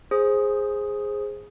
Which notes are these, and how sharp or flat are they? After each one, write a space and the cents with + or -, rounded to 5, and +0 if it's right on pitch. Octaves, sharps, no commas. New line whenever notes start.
G#4 -5 C5 +15 D#6 +5